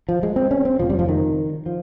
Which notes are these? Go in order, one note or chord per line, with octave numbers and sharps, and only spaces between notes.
F3
G#3
C4
C#4
C4
F1 F2 C#3 F3
G3
F3
D#3
F3